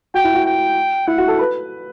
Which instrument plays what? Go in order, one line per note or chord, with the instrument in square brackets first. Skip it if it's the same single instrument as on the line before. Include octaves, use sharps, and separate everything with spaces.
[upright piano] F#4 [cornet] G5
[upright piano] E4
F#4
[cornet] G5
[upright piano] E4 [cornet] F#5
[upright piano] F#4
A4
B4